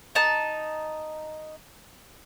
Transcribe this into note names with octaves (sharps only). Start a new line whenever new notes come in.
D#4 A5